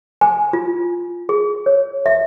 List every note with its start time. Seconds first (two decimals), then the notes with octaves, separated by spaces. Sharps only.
0.21 G#5
0.53 F4
1.29 G#4
1.66 C#5
2.06 E5